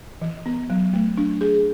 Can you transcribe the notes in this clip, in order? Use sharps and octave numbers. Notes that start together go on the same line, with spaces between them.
E3
B3
F#3
A3
D4
G#4